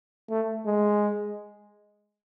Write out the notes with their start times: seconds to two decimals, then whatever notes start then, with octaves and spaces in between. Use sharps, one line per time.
0.30 A3
0.66 G#3